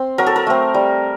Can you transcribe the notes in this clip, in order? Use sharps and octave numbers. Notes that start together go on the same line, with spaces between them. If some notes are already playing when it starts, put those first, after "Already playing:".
Already playing: C4
F#3 A#4
A4
A#4
A3 C4
G3